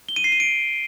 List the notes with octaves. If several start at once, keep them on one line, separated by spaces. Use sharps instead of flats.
G7
D#7
C7
D#7
D7